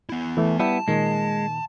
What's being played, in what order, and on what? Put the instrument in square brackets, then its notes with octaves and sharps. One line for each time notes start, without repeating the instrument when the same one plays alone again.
[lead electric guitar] B3 E4
[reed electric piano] E3 A3
[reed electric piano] G3 E4 G4 [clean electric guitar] B3 [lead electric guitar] A5
[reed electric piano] A#2 D#3 [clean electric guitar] G#3